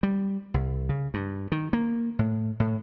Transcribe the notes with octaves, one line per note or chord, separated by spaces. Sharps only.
G3
C2
C#3
G2
D#3
A#3
A2
A2